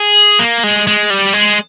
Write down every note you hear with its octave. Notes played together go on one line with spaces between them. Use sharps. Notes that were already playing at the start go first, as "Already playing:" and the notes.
Already playing: G#4
A#3
G#3
G#3
G3
G#3